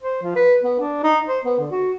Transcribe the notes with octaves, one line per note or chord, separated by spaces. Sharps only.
C5
F3
B4
B3
D4
D#4
C5
B3
D3
F#4